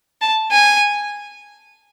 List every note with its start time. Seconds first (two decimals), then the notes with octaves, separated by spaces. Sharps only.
0.21 A5
0.51 G#5